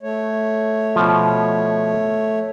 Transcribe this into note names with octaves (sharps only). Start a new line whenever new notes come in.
A3 C#5
B2 F3